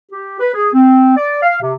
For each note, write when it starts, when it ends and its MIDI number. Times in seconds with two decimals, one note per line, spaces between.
0.12 0.37 67
0.40 0.52 71
0.54 0.68 68
0.74 1.14 60
1.17 1.40 74
1.42 1.58 77
1.61 1.74 48